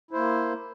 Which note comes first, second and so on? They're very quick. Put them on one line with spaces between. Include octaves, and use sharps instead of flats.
E4 C5 A#3